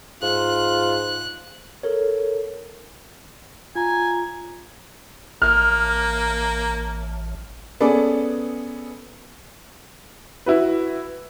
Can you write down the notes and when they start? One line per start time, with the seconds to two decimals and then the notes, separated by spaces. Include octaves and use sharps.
0.22 G#2 F4 F#6
1.83 A4 A#4 C#5
3.75 F4 G#5 A#5
5.42 A1 A#3 F6
7.80 B3 C#4 G#4 A4 B4 D5
10.46 E4 F#4 B4